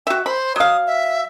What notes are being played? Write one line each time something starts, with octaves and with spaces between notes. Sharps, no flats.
F#4 E5 G5
C5 B5
F#3 F5 D#6
E5